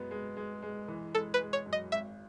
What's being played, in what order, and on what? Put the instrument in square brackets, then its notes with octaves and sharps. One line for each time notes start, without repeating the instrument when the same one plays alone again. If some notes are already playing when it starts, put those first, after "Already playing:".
Already playing: [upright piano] F#2 G#3 B3
G#3
G#3
G#3
E3
[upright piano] G#3 [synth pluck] A4
[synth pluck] B4
[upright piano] G#3
[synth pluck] C#5
[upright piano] F#2
[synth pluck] D#5
[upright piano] G#1 [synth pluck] E5